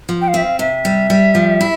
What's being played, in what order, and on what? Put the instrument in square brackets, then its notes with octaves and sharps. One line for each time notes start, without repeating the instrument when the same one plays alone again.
[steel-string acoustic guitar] F3
[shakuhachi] G5
F5
[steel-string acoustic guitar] C4 [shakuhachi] E5
[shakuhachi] F5
[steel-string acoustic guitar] C3 [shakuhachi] E5
[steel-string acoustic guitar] G3
G3
F3
E4